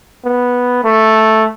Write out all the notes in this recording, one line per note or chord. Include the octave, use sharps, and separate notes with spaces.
B3
A3